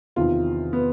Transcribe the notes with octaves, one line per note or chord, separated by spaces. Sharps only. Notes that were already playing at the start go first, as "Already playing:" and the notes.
E2 C3 D#3 F4
B3